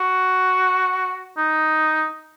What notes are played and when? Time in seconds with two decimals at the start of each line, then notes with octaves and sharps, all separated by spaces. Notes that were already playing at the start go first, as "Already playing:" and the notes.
Already playing: F#4
1.37 D#4